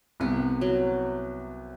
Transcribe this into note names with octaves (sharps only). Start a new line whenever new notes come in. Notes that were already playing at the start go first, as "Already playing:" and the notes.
C2 C3 B3
F#3